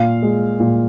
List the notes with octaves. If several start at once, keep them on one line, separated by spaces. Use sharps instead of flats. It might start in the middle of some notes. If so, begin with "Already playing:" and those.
Already playing: A#2 F5
G#3
A#2